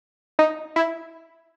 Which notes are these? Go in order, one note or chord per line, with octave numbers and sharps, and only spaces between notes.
D#4
E4